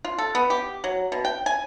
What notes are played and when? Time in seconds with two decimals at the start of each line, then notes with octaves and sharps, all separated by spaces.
0.05 F4
0.18 A4
0.35 B3
0.50 G4
0.84 F#3
1.12 B2
1.25 G5
1.46 G#5